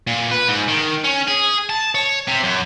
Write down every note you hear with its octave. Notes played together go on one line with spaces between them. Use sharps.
A#2
B4
G#2
D#3
C#4
G#4
A5
C#5
C3
F#2